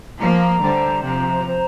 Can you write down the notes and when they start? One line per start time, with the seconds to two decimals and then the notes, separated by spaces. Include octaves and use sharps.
0.19 F3 A#3 A#5
0.61 D3 G3 C5
1.03 C3 F3 A#5
1.45 C5